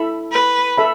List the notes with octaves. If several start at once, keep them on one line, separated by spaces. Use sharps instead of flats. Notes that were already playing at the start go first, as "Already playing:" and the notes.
Already playing: E4 A4 E5 B5
B4
A4 E5 B5